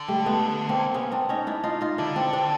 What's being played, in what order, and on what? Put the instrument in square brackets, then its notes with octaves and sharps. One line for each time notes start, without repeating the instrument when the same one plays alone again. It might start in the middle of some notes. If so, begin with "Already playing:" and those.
Already playing: [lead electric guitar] D3
[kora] G3 A3
A3 B3
A#3 C4
B3 C#4
C4 D4
C#4 D#4
D4 E4
D#4 F4
D#4 F4
[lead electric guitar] D3 [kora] D4 E4
[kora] C4 D4
C4 D4